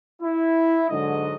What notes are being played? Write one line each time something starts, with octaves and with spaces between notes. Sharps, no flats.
E4
G#2 D3 F#3 D#5